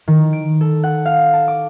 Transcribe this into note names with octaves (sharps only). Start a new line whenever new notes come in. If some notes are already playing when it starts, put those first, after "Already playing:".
D#3
D7
A4
F#5
F5
A5
D6